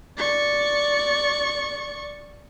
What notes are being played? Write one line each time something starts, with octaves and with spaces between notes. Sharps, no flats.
D5 C#6